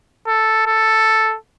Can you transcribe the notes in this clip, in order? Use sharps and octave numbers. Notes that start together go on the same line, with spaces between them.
A4
A4